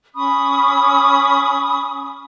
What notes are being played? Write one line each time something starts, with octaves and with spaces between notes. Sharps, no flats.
C#4 B5 C#6 D#6